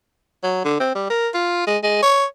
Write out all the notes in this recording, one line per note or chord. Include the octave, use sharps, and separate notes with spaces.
F#3
D3
C4
G3
A#4
F4
G#3
G#3
C#5